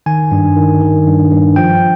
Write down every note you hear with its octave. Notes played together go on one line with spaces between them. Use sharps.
D#3 G#5
G2
D#3
D#3
G2
G2
F3 G5